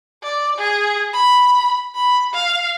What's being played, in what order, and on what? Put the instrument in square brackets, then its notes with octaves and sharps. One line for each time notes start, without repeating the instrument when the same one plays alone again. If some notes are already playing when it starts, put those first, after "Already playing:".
[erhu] D5
G#4
B5
B5
F5